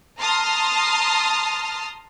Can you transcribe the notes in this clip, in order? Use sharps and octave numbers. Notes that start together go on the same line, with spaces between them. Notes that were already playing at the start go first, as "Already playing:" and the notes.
A5 A#5 C6 D#6 F6